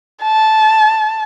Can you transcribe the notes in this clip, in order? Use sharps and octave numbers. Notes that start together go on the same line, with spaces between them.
A5